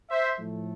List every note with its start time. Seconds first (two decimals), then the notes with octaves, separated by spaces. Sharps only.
0.09 C5 E5
0.39 A2 F3 A3